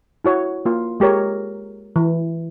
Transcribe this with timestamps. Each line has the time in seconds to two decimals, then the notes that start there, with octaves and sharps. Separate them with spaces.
0.24 E4 F#4 C#5
0.65 A#3 F4
1.00 G#3 G4 A#4 C#5
1.96 E3